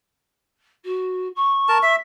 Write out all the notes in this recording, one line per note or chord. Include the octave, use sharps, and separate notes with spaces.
F#4
C#6
A#4 A5
E5